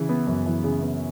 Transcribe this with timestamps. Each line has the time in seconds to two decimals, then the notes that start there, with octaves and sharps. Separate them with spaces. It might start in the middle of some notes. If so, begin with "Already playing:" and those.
Already playing: C#3 E3
0.09 B3
0.27 F#2
0.46 E3
0.64 C#3
0.82 B3